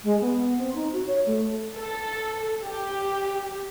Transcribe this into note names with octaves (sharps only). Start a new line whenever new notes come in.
G#3
B3
C4
D#4
F#4
C#5
A3
A4
G4